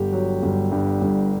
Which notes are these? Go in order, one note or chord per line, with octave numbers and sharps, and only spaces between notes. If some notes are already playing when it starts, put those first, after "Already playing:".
Already playing: G1 G4
F#3
G1
G2
G1